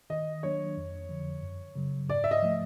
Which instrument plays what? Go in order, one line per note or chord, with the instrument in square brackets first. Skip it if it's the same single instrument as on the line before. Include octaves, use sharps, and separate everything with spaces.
[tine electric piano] D#3 [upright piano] D#5
[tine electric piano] F#3 A#3 D4 [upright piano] C#5
[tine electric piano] F2
D3 F3
F#2
C#3 F#3
[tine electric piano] G#2 [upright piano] D5
[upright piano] E5
D#5
[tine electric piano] F3 A3